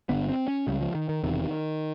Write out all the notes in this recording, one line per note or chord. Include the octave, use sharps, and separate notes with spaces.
G1 F2 D3 B3
C4
C#4
C#2 C#3 G3
F3
D#3
D#3
E1 E2 C3 D#3